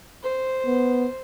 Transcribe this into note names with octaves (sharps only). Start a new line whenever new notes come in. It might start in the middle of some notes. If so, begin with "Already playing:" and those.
C5
B3